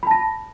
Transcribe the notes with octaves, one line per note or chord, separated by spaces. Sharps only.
A5 B5 A#6